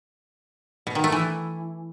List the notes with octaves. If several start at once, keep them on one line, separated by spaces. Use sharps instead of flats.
B2
D#3
A3
E3